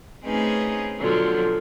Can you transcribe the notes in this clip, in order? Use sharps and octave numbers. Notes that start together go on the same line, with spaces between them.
A3 C4 C#4 D#4 G#4 B4
B2 D3 F3 F#3